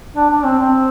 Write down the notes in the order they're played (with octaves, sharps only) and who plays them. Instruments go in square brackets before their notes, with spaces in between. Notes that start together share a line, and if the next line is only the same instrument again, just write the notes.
[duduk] D4
D4
C4
C4